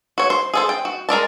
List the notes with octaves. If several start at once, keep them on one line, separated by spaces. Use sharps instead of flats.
F#4 C#5
C5
G#4 A4 C5
G5
F#4
G#3 A#4 D5 A5